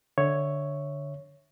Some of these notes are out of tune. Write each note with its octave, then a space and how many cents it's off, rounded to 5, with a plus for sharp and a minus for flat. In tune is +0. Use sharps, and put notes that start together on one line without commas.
D3 +0 C#5 +0 E5 +0